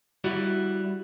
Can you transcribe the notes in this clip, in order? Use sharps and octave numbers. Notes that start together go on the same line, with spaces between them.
G3 E4 F#4 D5